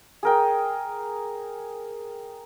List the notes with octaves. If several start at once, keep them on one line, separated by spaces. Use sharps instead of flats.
G#4 A#4 G5